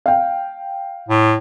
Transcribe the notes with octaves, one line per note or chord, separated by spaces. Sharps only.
F5 G5
A2